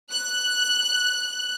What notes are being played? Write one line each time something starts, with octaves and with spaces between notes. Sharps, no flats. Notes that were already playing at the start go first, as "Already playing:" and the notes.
F#6